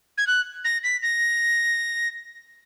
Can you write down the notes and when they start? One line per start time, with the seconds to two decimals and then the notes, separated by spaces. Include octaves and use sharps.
0.18 G#6
0.27 F#6
0.65 A#6
0.84 B6
1.03 A#6